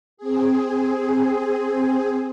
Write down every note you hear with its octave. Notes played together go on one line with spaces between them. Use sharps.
C4 G#4